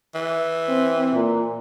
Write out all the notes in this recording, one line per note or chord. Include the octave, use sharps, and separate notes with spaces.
E3
C4
A#2